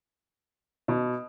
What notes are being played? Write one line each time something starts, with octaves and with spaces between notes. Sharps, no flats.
B2